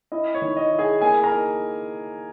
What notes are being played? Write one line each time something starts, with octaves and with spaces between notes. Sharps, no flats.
E4 D#5
C#5
D#3
D#5
E4
G#4 G#5
A#3 G#4 G#5
A#4 A#5
D#4